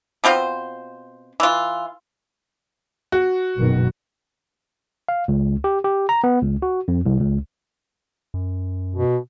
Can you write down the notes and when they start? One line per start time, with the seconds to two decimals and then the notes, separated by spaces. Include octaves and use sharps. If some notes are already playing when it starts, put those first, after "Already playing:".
0.24 B2 C4 F4 C5
1.40 E3 F4
3.12 F#4
3.58 F#1 B2 D#3
5.09 F5
5.28 C#2
5.64 G4
5.84 G4
6.09 A#5
6.24 B3
6.43 C#2
6.62 F#4
6.88 F2
7.06 C2
7.20 C#2
8.34 F#2
8.95 B2